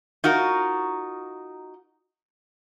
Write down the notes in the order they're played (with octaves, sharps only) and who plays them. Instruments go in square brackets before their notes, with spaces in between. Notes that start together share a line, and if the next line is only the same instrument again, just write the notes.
[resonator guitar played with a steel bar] D#4 F4 F#4 A#4